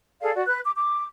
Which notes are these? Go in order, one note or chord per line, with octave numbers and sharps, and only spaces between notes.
G#4 A4 D5 F5
F#4 D5
B4 F#6
D6
D6